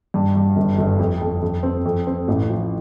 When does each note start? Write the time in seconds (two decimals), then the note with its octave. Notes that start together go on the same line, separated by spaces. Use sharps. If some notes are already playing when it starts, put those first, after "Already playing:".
0.14 G2
0.36 G2
0.56 G1
0.78 G1
0.99 F2
1.21 F2
1.42 F2
1.63 C4
1.85 F2
2.07 C4
2.28 A1
2.49 F3